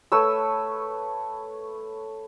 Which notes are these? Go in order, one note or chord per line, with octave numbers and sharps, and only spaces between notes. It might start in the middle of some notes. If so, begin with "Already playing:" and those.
A3 B4 C#5 E6